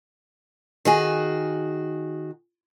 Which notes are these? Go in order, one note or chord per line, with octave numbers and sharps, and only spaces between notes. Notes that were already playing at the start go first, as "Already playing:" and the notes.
D#3 F#4 G#4